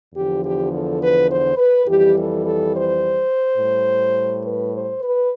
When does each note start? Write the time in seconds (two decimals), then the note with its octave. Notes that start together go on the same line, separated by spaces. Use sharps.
0.14 E2 D3 F3 G4
0.42 G4
0.71 A4
0.99 B4
1.29 C5
1.57 B4
1.86 F2 E3 G3 G4
2.15 A4
2.43 A4
2.72 C5
3.58 A2 G3
4.44 B4
4.72 C5
5.01 B4